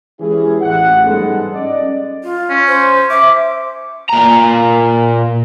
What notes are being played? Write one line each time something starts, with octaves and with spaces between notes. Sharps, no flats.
E3 G#3 C#4 E4 G4 G#4
A1 F2 F#5
G#2 G3 G#3 B3 G4 A4
C#4 D5 D#5
F4
C#4
C5
E5 D6
A#2 A#5